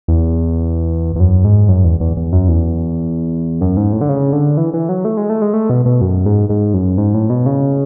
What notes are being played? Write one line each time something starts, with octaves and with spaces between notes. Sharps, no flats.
E2
E2
F#2
G#2
F#2
E2
E2
E2
F#2
E2
F#2
G#2
A2
D3
C#3
D3
E3
E3
F#3
A3
G#3
A3
G#3
A3
B2
B2
F#2
G#2
G#2
F#2
G#2
A2
B2
C#3